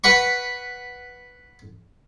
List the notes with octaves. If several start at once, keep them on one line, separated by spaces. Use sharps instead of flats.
B4 F#5 B5 C#6